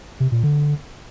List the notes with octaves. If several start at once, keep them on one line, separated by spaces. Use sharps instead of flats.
C3
A#2
D3